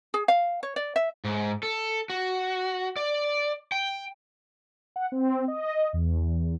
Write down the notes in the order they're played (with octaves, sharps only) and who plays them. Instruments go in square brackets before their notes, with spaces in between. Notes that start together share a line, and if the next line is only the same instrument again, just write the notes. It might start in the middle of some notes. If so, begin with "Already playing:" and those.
[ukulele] G#4
F5
C#5
D5
E5
[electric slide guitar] G#2
A4
F#4
D5
G5
[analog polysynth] F#5
C4
D#5
E2